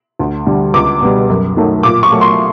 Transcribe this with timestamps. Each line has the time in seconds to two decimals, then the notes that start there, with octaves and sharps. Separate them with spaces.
0.19 D2
0.46 D3 G3
0.74 C#2 D6
1.01 B2 G3
1.29 F#2
1.57 D#3 F#3 A3
1.83 A#2 D6
2.03 C#6
2.12 F#3 A3
2.21 C6